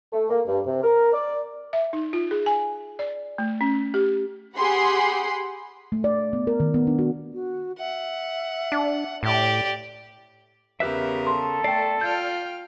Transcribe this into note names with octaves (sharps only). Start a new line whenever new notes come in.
A3
A#3
G2
C3
A#4
D5
E5
D#4
F4
G#4
G#5
D5
A3
C#4
G4
G4 G#4 F#5 B5 C6
A3
D5
B3
A#4
D#3
B3
D4
F#4
F#4
E5 F#5
D4
A2 G4 D5
E2 C#3 G4 A#4 B4 E5
A4 C6
A3 D5 G5 C7
F4 G5 F6 G6